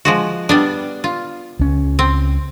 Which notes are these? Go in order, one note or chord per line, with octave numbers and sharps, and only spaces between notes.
F3 G#3 F#4
G3 B3 D4
F4
C#2 C#4
C4